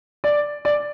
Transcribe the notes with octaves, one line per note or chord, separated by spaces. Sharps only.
D5
D5